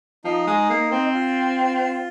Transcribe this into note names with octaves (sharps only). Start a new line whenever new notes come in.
F3 D#4
G#3
A#3
C4
F4